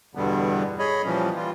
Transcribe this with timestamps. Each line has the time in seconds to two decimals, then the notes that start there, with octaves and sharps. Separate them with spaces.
0.15 E2 G2 B2 D3 G3 B3
0.79 G#4 C#5 D#5 B5
1.04 A#2 E3 F3 G3 C#4
1.36 E3 G3 F4